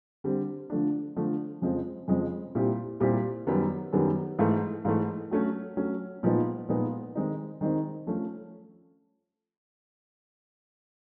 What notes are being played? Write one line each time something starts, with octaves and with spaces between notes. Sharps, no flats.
D3 G3 C4
D3 F3 A3 D4
D3 F3 A3 D4
F2 C#3 F3 G#3 C4
F2 C#3 F3 G#3 C4
A#2 G3 C4 E4 G4
A#2 G3 C4 E4 G4
F#2 D#3 G3 B3
F#2 D#3 G3 B3
G#2 E3 A3
G#2 E3 A3
F#3 A3 C#4
F#3 A3 C#4
A#2 F3 G#3 B3 D#4
A#2 F3 G#3 B3 D#4
D#3 G#3 C4 D#4
D#3 G#3 C4 D#4
F3 A3 C#4